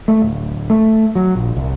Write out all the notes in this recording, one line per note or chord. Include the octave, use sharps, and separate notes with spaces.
A3
D1
A3
F#3
A#1
C2